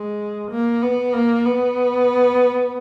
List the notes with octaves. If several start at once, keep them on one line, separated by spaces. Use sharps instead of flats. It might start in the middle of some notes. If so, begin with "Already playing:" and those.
Already playing: G#3
A#3
B3
A#3
B3